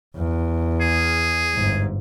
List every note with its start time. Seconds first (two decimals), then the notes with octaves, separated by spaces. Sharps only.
0.16 E2
0.81 G#4
1.55 G1 G#2